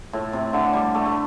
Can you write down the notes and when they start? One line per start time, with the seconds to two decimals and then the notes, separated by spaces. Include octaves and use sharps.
0.13 A2
0.33 C3
0.53 D3
0.73 G3
0.94 A3
1.06 A3